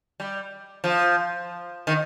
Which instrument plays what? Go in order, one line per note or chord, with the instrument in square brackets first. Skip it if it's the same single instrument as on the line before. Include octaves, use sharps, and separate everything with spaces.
[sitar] G3
F3
D#3